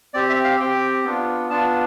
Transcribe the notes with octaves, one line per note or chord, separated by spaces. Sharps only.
C4 G4 D5
E5
F5
C4 G4 G5
B3 D4 F4
B3 D4 F4 A5